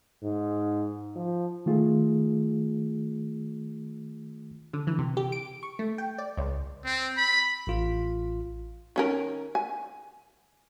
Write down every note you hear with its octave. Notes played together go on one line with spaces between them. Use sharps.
G#2
F3
D#3 A3 F4 G#4
D3
E3
C3
G4
D7
C#6
A3
G5
D5
C#2
C4
B5
A1 F4
D#3 C#4 A#4
G#5